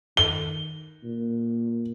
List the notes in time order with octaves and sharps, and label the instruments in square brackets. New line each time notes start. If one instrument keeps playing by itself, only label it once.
[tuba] D#3 [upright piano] G7
[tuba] A#2